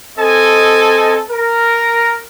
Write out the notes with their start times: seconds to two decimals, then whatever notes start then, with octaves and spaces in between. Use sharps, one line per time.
0.17 C4 A4 D#5 G#5
1.30 A#4